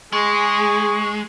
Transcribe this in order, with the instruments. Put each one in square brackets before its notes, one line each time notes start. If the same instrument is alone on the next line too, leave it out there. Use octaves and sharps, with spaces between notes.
[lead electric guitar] G#3 [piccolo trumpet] G#4 [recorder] C#6